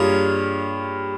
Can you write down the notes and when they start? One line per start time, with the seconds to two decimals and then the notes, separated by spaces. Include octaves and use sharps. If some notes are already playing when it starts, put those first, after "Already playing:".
Already playing: G2 A#3 F4 G#4 C#5